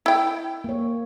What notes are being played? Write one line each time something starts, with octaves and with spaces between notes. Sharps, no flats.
E4 G5
A#3 C#5